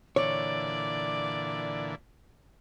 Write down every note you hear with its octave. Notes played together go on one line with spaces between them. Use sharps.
A#2 D3 E3 C#5 D5